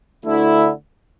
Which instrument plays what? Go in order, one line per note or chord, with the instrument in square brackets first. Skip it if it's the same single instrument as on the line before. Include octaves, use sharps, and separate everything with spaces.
[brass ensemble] D2 D3 A3 E4